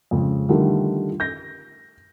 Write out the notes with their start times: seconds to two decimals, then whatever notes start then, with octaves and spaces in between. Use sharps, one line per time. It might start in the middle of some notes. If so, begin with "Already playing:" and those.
0.11 F2 C#3 G#3
0.49 D3 D#3 F3 G3 A3 D#4
1.20 G6 A#6